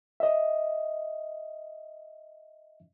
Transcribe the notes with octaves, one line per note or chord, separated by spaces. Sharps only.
D#5 E5